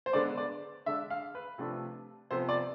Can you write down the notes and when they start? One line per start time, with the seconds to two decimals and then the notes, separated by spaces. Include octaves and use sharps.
0.06 C5
0.13 D3 G#3 B3 D4 D5
0.37 D5
0.86 D3 G#3 D4 E5
1.10 F5
1.35 B4
1.58 C3 F3 A3 D4
2.31 C3 F3 B3 C5
2.49 D5